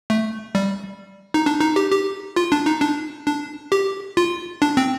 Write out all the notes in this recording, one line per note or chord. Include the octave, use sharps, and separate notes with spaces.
A3
G3
D#4
D4
D#4
G4
G4
F4
D4
D#4
D4
D4
G4
F4
D4
C4